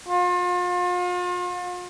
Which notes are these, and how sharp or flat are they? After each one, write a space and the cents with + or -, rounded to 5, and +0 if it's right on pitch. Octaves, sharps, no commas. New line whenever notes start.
F4 +40